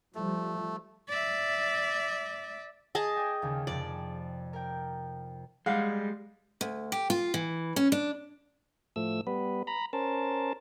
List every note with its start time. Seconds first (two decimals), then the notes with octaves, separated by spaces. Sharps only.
0.15 F3 G3 A3
1.09 D5 E5
2.95 G#4 D#5 A5
3.16 D5 G5 G#5
3.42 D#2 C#3
3.67 F2 C3 D5
4.53 A#4 G5
5.66 G3 G#3 F5 F#5
6.61 D2
6.92 G4
7.10 F4
7.34 E3
7.76 C#4
7.92 D4
8.96 A2 F3 A3 E6
9.27 G3 B3 B4
9.67 A#5 B5
9.93 C#4 A#4 C5 A5